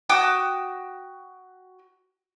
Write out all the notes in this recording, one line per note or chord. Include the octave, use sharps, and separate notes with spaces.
F#4 G5 D6 D#6